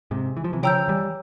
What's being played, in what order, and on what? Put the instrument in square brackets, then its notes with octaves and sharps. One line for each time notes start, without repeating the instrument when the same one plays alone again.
[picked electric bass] G#2 C3
E3
F3
C3 E3
[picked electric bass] C#3 F3 [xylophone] C#5 G5 A#5 E6 G6
[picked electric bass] E3 G3